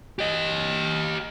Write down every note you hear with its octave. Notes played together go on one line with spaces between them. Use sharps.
G4 D#5